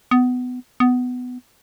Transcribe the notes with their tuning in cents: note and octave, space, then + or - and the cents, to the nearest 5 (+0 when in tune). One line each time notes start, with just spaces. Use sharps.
B3 +20
B3 +15